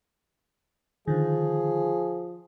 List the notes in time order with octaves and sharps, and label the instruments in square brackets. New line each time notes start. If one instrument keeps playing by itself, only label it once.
[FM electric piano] D3 D#3 [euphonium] F3 [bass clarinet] G#4